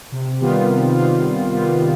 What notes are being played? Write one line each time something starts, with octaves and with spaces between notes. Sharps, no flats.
C3
D#3 G3 B3 F4
C3
D#3 G3 B3 F4
C3
D#3 G3 B3 F4
C3